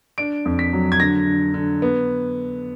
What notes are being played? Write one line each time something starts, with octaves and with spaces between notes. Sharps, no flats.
D4 D7
F2
B6
F#3
G#6
D3 A#6
D3
D3
B3